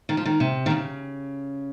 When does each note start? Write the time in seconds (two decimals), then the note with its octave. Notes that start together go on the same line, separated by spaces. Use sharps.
0.09 D#3
0.17 F3
0.25 D#3
0.40 C3
0.66 D#3
0.70 C#3